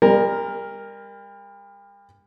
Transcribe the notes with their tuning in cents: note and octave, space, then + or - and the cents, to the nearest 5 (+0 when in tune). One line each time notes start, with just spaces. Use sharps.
G3 +40 A#4 +0 A#5 +0